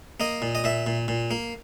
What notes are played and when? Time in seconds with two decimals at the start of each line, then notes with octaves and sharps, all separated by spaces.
0.20 A#3 D#5
0.42 A#2
0.55 D#5
0.64 A#2 E5
0.87 A#2
1.08 A#2
1.31 A#3